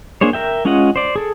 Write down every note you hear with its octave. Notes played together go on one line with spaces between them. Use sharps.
A#3 D4 G#4 C5 C#5
A#4 E5 G5
G#3 C#4 F4 D#5 F#5
C5 D5
G#4 A4